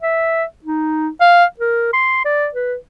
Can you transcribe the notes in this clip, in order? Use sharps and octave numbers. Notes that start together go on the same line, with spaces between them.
E5
D#4
F5
A#4
C6
D5
B4